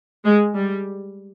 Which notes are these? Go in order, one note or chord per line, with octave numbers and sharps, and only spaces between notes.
G#3
G3